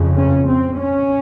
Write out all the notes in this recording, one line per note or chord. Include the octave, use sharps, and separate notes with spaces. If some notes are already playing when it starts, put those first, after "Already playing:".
Already playing: F2 C#3
C#4
C4
C#4